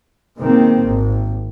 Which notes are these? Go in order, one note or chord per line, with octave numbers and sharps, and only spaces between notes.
B2 D#3 G#3 A#3 C4
G#1